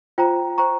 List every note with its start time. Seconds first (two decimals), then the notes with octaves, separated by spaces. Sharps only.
0.18 F4 C5 G5 A#5
0.58 C5 G5 A#5 C#6